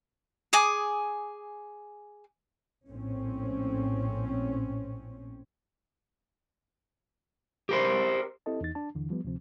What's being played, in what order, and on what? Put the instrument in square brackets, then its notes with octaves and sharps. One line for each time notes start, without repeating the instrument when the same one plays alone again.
[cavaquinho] G#4 G#5 D6 D#6
[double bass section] A#1 A2 C4 C#4
[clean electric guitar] G4 A#4 C5
[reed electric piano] C4 E4 G4 A4 D#5 A5
E2 D#4 A6
D4 A5
D#2 D3 E3
F3 G3 B3
D2 C3 F3 C4